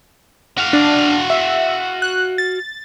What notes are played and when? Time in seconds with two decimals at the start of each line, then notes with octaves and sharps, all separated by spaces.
0.58 F#4 F5
0.73 D4
1.30 E5
2.02 F#6
2.38 A6